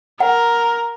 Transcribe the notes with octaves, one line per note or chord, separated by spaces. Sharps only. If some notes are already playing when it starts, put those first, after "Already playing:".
A#4 F#5